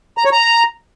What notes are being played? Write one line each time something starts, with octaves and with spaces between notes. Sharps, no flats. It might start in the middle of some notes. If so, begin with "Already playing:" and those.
A#5
C#5
A#5